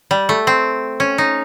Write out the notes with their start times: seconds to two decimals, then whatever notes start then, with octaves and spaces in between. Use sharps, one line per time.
0.11 G3
0.29 A3
0.47 C4
1.00 C#4
1.18 D#4